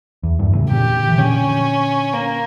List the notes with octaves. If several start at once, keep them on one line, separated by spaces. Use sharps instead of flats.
E2
E2 G2
A2 C#3
A#2 D3 G4
E3
A#2 D3 C#4
A#3